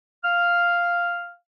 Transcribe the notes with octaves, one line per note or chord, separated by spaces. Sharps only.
F5 F6